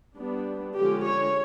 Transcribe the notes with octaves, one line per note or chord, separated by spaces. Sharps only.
G3 B3 D4
D3 F3 G#3 C#4 G4
C#5